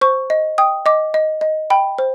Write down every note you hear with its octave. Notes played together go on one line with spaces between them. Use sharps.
C5 C#6
D#5
G5 D#6
D#5 D6
D#5
D#5
G5 B5
C5